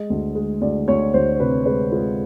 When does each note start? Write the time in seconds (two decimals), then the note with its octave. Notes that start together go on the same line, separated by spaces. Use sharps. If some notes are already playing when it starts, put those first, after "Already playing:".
Already playing: G#3 D#5
0.10 D2
0.35 G#3
0.61 D2 D5
0.88 D2 C#5
1.14 D2 C5
1.39 C3 B4
1.65 G#3 B4
1.92 G#3 F4